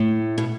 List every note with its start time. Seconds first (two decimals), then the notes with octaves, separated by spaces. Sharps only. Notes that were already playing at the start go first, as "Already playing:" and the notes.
Already playing: A2
0.38 B2